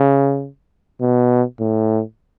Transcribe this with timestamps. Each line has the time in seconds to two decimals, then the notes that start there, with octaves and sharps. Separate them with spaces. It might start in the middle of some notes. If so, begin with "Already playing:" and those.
Already playing: C#3
1.01 B2
1.60 A2